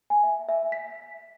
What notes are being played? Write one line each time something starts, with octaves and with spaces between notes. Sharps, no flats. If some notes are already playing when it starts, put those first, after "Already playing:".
G#5
E5
E5
B6